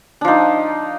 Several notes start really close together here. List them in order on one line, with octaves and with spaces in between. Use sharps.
D4 F3 D#4